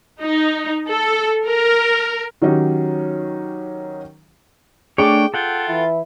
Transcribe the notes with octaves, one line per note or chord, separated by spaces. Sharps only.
D#4
A4
A#4
D#3 F#3 C#4 D#4 G4
A3 D4 G#4 C#5 G5 D6
F4 A4 F#5 G5
E3 E4